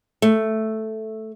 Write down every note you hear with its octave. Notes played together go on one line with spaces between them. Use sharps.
A3